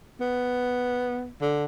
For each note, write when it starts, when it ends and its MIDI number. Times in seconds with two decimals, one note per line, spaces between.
0.21 1.28 59
1.42 1.65 50